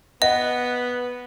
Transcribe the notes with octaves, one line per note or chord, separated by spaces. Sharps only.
B3 D#5 F#5